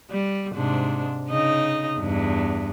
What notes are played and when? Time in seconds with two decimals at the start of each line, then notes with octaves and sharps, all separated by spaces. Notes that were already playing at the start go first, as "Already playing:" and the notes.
0.10 G3
0.54 G#2 C3 D4
1.30 C#3 D#4 D#5
2.00 E2 G2